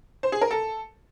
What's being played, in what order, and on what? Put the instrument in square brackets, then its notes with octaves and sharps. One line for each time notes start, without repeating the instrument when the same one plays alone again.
[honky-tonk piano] C5
G#4
A#4
A4